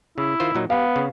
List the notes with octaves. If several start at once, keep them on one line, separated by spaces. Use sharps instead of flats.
C#3 E4
D#3 F4 C5
A#2 F#3 D#4
B3 G4 F5
C#3